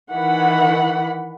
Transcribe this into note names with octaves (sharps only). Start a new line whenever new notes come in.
D#3 E3 F#5 B5